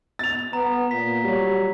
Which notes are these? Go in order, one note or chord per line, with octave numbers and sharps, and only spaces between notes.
A6 F7
B3 A#5
A#2 B6
F#3 G3